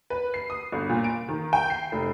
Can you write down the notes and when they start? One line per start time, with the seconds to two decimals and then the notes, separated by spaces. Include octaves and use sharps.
0.10 B4
0.34 C7
0.50 D#6
0.72 G1
0.89 A#2
1.04 D7
1.29 D#3
1.53 G5
1.70 C7
1.92 F1